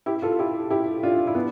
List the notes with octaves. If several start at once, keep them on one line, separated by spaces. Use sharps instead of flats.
E4 G4
F4 A4
E4 G4
E4 G4
D4 F4
E4
B3 D4